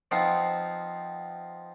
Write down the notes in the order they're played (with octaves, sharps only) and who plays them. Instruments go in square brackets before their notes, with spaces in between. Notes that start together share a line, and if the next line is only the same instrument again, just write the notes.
[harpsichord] F3 B3 C4 D#4 F4